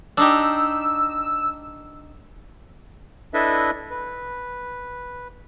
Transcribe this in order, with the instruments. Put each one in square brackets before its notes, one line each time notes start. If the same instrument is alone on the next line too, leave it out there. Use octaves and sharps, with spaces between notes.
[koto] D4 D#4 G4 [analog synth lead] E6
[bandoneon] D4 E4 A4 B4 D#5 E5
B4